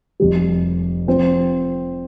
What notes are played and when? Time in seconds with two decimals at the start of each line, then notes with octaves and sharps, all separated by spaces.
0.20 F1 F2 C3 G3
1.07 F3 C4